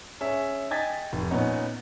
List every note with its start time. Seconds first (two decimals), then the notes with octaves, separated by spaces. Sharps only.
0.21 C#4 G#4 E5
0.70 D#5 G5 G#5 G#6 A6 B6
1.13 F1
1.31 A#2 B3 C#4 D#4